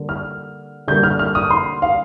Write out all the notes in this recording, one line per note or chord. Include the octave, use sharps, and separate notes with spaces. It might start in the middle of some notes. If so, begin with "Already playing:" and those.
Already playing: D3 G3 A#3
F6
D3 G3 A#3 G6
F6
F6
D#6
C6
F5